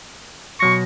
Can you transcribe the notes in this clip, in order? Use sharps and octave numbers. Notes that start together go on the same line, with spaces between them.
B2 F#3 C#6 A#6